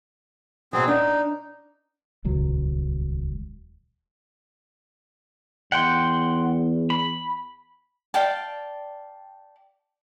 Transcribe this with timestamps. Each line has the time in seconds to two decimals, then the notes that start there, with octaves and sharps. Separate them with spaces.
0.73 B2 F#3 C4 G#4
0.88 D4 D#4
2.25 D#1 C#2 F#3
5.72 E2 F#5 G5 C6
6.90 B5
8.14 D5 F5 G5 A5